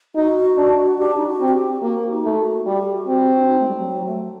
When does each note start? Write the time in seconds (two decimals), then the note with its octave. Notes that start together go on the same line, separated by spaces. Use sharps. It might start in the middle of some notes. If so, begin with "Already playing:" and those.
0.15 D#4 F#4
0.57 D4
0.99 D4 G4
1.17 D#4
1.27 F#4
1.41 C4
1.48 F#4
1.55 G4
1.82 A#3 F#4
2.10 D#4
2.25 A3
2.38 F#4
2.65 G3 G4
2.94 F#4
3.07 C4
3.22 F#4
3.39 D4
3.49 D#4
3.60 A3
3.68 G3
3.77 F#3
4.06 A3